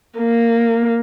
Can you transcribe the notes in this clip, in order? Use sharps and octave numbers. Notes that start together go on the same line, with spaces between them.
A#3